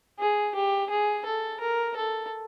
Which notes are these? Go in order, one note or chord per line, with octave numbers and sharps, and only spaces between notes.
G#4
G4
G#4
A4
A#4
A4